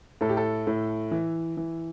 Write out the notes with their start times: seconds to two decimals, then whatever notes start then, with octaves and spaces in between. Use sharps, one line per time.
0.21 A2 A4
0.29 G4
0.37 A4
0.67 A2
1.11 E3
1.57 E3